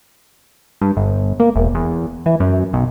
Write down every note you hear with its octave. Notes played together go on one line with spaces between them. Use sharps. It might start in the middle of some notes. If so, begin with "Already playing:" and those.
G2
G1
A#3
E1
E2
E3
F#2
B1